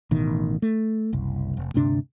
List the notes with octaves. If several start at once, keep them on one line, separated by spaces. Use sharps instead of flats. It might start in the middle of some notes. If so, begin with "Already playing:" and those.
A1 B2 D#3
A3
F#1 C2
F1
D2 G2 C3 D4